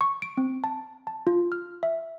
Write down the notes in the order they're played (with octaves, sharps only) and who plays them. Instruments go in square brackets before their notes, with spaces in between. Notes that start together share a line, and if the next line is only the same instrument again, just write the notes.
[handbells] C#6
D7
C4
A5
A5
F4
F6
E5